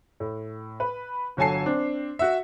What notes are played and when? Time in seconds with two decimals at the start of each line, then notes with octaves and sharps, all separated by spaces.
0.20 A2
0.80 B4
1.37 G1 F#3 A4 G#5 A5 C7
1.66 C4 D4
2.19 F#4 E5